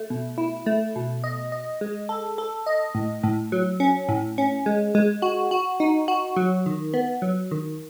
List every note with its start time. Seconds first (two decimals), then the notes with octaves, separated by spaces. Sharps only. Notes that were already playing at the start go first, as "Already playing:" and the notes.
Already playing: A3
0.10 B2
0.38 E4
0.66 A3
0.96 B2
1.24 D#5
1.52 D#5
1.81 G#3
2.09 A4
2.38 A4
2.66 D#5
2.95 A2
3.23 A2
3.52 F#3
3.80 C#4
4.09 A2
4.38 C#4
4.66 G#3
4.95 G#3
5.22 F#4
5.51 F#4
5.80 D#4
6.08 F#4
6.36 F#3
6.66 D#3
6.94 B3
7.22 F#3
7.51 D#3